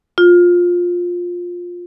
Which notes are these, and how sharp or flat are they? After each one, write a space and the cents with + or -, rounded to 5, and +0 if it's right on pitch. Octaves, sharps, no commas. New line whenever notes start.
F4 +15